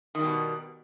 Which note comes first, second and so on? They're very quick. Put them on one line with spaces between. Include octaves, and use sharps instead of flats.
D#3 G3 B2